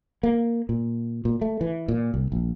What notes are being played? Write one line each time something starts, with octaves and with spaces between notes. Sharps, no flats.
A#3
A#2
A#2
A3
E3
A#2
C2
A#1